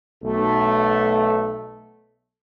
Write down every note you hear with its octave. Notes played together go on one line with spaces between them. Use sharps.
B1 A3